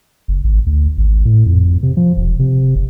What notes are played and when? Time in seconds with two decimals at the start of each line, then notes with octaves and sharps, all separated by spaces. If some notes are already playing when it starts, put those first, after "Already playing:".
0.28 F#1
0.44 G#1
0.66 D2
0.98 G#1
1.25 A2
1.46 F2
1.83 C3
1.97 F3
2.17 E1
2.39 C3
2.76 F#1